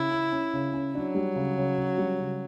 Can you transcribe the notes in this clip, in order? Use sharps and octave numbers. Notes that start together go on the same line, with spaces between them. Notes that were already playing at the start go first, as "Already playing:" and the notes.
Already playing: C#3 E4
C#4
C#4
C#3
C#4
F#3 D4
G3
C#3
C#3
C#3
G3
C#3